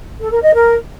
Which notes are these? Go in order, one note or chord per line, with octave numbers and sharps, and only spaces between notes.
A4
A#4
D#5
A#4